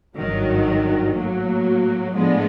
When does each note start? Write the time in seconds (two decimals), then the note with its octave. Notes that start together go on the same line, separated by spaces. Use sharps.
0.16 G#1 G2 D#3 F#3
1.15 A2 F#3 A#3
2.13 A2 F3 G#3 B3 D4